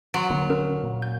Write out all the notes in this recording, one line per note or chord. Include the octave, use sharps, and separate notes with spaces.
F#3 C6 D7
D#1 D3 A#3
C#4 A#4
A#2
G6